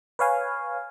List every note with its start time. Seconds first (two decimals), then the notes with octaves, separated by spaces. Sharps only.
0.19 B4 C#5 F5 G#5